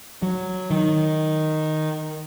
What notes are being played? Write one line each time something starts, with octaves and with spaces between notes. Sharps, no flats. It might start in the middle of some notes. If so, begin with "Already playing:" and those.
F#3
D#3